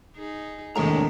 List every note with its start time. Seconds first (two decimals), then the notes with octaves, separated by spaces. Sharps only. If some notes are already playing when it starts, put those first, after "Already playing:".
0.15 D#4 G#4
0.76 D#2 A2 C3 G#3 D4 A#4 A#5